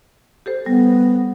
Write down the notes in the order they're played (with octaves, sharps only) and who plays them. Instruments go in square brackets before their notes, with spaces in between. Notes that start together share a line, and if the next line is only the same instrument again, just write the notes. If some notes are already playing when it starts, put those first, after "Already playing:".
[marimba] G4 A4 C5
[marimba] G3 [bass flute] B3